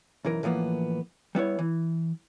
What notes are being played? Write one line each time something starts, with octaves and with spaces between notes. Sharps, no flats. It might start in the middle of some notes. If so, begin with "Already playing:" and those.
B1 F#2 E3 A#4
A2 E3 F3 A#3 B3
G3 B3 E4 C#5
E3